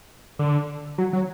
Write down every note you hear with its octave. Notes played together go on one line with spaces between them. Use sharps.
D3
F#3
F#3